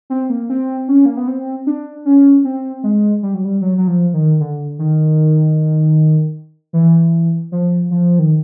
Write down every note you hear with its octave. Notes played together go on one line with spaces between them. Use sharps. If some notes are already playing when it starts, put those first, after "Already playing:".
C4
A#3
C4
C#4
A#3
B3
C4
D4
C#4
C4
G#3
G3
F#3
G3
F#3
F#3
F3
D#3
D3
D#3
E3
F3
F3
D#3